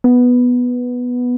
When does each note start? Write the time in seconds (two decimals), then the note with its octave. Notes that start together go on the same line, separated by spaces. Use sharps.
0.04 B3